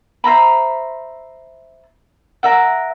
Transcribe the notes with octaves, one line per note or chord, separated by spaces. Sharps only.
C5 E5 A#5 B5
A#4 E5 F#5